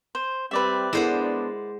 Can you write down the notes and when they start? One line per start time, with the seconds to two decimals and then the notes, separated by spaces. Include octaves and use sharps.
0.15 C5
0.51 G3 C4 B4 D5 E5
0.93 G#3 B3 D4 E4 A4 A#4 C5 F#5